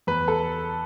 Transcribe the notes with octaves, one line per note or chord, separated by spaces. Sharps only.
E2 B4
A4